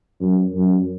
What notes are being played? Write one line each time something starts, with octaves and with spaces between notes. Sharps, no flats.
F#2
F#2